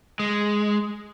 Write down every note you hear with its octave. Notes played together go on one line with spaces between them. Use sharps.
G#3